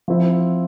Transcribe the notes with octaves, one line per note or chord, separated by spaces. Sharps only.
F3 C4 E4